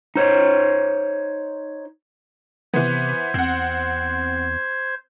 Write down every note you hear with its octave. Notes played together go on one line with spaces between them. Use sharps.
D#4 C5 C#5
C3 E3 B3 C5 G#6
E2 C4 F#5